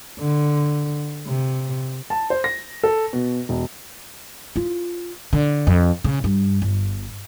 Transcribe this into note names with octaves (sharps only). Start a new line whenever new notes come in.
D3
C3
A5
C5
A#6
A4
B2
E1
F4
D3
F2
C#3
G2
G1